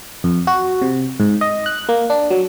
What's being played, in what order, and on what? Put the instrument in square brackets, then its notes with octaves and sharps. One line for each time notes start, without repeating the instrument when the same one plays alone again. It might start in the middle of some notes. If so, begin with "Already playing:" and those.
[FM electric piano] F2
F#4
C3
G#2
D#5
F#6
A#3
D4
F#3